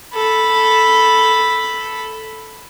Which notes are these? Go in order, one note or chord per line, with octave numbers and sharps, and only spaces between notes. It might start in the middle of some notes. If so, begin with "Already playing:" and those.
A4 B5